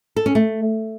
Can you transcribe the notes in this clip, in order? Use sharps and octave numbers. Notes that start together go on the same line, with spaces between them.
A4
C#4
A3